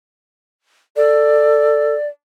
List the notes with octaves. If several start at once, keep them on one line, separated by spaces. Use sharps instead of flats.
A4 D5